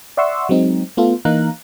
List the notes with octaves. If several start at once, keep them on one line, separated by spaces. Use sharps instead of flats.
D5 E5 F#5 C6 C#6 E6
F#3 G#3 C4 D#4
A3 B3 F4 A4
E3 A#3 D#4 F5 A#5 F#6